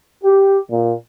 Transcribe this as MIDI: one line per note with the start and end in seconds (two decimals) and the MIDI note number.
0.23 0.57 67
0.70 0.92 46